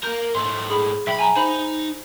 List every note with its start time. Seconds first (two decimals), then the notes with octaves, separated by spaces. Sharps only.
0.03 A#3 A#4 G6
0.35 G#2 A3 C6
0.69 G#4 B5
1.07 B1 E5 G5 B5
1.19 G#5 A#5
1.36 D#4 C5 B5